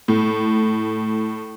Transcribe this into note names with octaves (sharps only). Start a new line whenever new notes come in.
A2